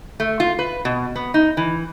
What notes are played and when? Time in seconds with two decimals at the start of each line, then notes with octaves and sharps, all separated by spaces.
0.20 A3
0.40 F4
0.59 B4
0.85 B2
1.16 B3
1.34 D#4
1.57 E3